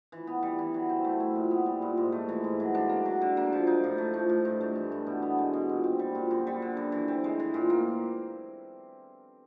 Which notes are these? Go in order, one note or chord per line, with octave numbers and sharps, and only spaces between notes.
E3
B3
G3
E3
F#3
C4
A3
E4
A#2
B3
G3
A#2
G#2
A3
E3
G#2
F#3
D4
A#3
F#3
D3
A#3
F3
D#4
A2
A3
F3
A2
G2
A3
E3
G2
B2
B3
G#3
B2
A#2
C4
G3
A#2
F#2
G3
D3
F#2
E3
C4
G#3
E3
A#2
A#3